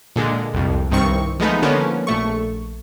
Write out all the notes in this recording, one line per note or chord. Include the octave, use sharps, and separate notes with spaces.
A#2 D3 G#3
C2 F2
C2 G2 D#3 C4 C#6
F3 G#3 A3 B3 D#4
D3 F3 A#3 B3 C#4
A#1 A3 C#6